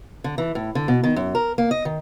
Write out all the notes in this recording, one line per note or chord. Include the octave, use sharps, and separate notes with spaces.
D3
E3
A2
D3
B2
D#3
F#2
A#4
A#3
D#5
D#3